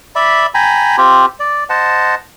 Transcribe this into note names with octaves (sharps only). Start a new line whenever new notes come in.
D5 E5 B5
G5 G#5 A#5 B5
C4 F4 G4
D5
C5 D#5 F#5 A5